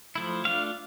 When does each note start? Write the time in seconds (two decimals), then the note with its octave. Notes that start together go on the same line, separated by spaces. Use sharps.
0.16 F3 A3 E4
0.45 A3 D4 F4 F5